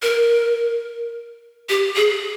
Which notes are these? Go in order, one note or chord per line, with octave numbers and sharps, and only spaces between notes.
A#4
G4
G#4